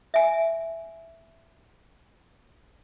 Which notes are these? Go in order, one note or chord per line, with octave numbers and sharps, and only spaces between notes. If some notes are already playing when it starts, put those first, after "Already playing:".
E5 G#5